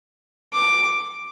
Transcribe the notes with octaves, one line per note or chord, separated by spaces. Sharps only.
D6